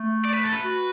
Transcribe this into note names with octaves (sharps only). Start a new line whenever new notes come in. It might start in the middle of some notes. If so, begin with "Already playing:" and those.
Already playing: A3
D5
B4
A4
B4
F#4